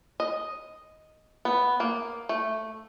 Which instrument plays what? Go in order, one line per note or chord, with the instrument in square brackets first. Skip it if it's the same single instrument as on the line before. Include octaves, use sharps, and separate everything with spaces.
[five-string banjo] D#5
B3
A#3
A3